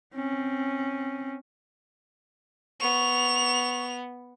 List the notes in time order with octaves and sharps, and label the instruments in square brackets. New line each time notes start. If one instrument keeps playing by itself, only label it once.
[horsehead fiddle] C4 C#4
[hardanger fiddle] B3 [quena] C#6 [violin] F7